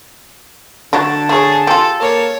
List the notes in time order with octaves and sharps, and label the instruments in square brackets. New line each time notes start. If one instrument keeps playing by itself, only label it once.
[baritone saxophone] D3 [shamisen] F#3 A3 D4 [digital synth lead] A5
[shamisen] A3 C#5 [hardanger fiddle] G#4
[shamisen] F4 G4 [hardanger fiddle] A4
[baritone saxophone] A#3 [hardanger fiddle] C#5